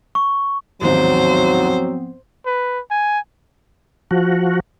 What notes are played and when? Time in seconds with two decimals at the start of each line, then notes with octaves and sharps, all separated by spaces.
0.15 C#6
0.81 A1 D#2 G#2 F3 F#3 B3 C4 C5
2.46 B4
2.91 G#5
4.11 F3 F#4